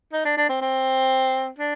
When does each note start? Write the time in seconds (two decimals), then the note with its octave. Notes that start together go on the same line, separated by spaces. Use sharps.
0.13 D#4
0.25 D4
0.37 D4
0.49 C4
0.61 C4
1.58 D4